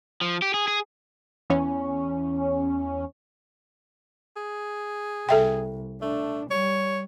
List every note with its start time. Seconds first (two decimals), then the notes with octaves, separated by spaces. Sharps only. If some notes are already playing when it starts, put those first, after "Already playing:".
0.21 F3
0.42 G4
0.54 G#4
0.68 G#4
1.50 E2 C#4
4.37 G#4
5.29 C2 A4 E5 G5
6.02 A3 D4
6.51 G3 C#5